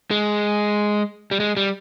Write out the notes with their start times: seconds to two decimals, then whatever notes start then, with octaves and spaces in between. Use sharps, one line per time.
0.11 G#3
1.31 G3
1.40 G#3
1.57 G3